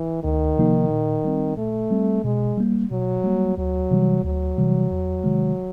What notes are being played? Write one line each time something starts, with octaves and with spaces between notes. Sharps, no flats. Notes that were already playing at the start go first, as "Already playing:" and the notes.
Already playing: E3
D2 D#3
C3 F3 A#3 D#4
A#2
G3 C4
A#2 A3
G3 C4
B2 G#3
G3 A#3
B2 F#3
G3 A#3
D2 F#3
C3 E3 G3
D2 F#3
C3 E3 G3
E2
C3 D#3 G#3